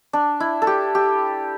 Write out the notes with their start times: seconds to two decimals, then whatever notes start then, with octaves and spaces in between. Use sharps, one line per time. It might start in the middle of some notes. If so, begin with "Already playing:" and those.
0.13 D4
0.40 E4
0.62 A4
0.67 G4
0.95 G4